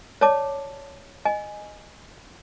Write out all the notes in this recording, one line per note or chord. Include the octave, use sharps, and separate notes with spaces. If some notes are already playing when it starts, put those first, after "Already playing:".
C#5 D5 A5 D6
D#5 G#5